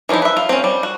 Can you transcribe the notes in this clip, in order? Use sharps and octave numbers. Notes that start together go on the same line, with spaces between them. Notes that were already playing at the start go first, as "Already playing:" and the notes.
E3 F3 C#4 D#4 E4
B4 E5
F4
C4 C#4
G3
F#4